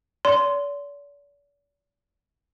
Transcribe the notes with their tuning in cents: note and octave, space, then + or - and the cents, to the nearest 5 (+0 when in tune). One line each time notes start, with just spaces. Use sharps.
D5 -45 C6 -10